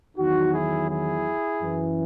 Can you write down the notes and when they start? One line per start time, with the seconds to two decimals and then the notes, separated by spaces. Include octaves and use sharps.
0.17 E2 D#3 F#3 D#4 F#4
0.54 E4 G#4
0.90 E4 G#4
1.61 F#2 E3